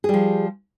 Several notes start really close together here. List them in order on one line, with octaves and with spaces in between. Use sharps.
G#4 G3 F3